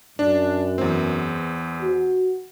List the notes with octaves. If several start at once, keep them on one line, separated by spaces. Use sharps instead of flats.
F#2 D4
E2 C4
F#4